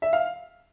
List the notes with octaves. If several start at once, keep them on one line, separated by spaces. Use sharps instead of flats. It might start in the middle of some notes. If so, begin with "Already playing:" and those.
E5
F5